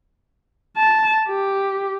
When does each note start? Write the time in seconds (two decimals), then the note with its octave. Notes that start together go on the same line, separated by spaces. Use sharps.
0.77 A5
1.29 G4